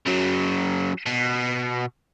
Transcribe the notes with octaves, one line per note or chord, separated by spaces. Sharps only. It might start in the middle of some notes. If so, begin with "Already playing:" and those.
C#3 F#3
B2